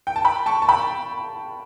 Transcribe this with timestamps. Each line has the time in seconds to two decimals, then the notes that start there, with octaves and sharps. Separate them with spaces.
0.07 G5
0.16 A5
0.25 G5 B5
0.46 A5 C#6
0.62 A5
0.69 G5 B5